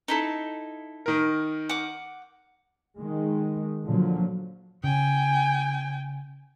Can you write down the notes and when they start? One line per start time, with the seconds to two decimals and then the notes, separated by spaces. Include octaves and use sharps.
0.08 D#4 E4 A4
1.06 D#3 A#4
1.69 F#5 D6
2.98 D#3 G#3
3.85 A#2 D3 F3 F#3
4.84 C#3 G5 G#5